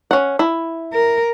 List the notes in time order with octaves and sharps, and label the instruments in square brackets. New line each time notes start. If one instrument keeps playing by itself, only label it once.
[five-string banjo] C#4 F#5
E4
[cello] A#4